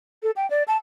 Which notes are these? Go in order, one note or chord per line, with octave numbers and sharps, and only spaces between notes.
A4
G5
D5
A5